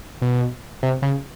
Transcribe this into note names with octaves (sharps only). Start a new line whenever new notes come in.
B2
C3
C#3